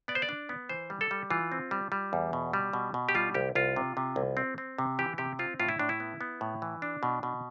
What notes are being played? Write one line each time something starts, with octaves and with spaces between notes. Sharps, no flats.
B3 D5
C5
D5
D4
B3
E3 C5
G3
A4
G3
E3 F4
C4
G3
G3
E2
B2
G3
B2
B2
G4
G3 F4
C2 G4
C2 F4
C3
C3
C2
C4
C4
C3
E3 G4
C3 G4
C4 F4
A2 F4
E4
A2 D4
E4
B3
B3
A2
E3
D4
B2
B2